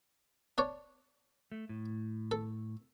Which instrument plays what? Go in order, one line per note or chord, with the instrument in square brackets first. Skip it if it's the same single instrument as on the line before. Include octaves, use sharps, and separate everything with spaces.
[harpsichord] D4 C#5 D5
[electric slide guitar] A3
A2
[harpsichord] A4